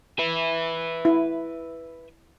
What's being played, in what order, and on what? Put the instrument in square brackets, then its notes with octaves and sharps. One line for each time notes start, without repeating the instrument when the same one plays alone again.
[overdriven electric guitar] B4 E5
[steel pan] E4